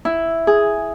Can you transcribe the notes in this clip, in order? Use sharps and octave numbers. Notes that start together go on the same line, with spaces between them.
E4
G#4